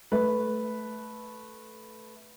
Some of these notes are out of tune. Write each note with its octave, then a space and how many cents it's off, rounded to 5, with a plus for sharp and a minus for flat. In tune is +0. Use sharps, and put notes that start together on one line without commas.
A3 -10 B4 +0